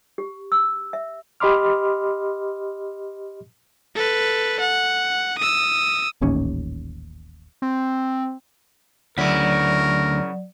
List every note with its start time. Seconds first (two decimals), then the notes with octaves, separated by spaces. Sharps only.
0.18 G4
0.52 E6
0.93 E5
1.40 G4 D#5 B5 C6 D6 F6
3.95 A4 B4
4.60 F#5
5.38 D#6 E6
6.21 D#1 A1 D#2 C#4
7.62 C4
9.18 D2 C#3 F#3 E4 A#4 D5